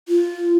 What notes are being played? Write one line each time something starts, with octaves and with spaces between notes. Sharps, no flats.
F4